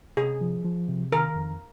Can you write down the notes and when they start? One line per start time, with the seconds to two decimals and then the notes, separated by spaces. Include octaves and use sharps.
0.17 C3 G#4
0.41 F3
0.65 F3
0.88 C3
1.12 D#3 A#4
1.36 F2